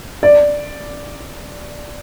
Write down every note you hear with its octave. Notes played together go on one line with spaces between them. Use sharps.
D5